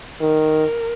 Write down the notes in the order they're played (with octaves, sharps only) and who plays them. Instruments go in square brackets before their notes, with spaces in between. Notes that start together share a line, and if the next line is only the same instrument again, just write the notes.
[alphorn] D#3 [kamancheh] A#4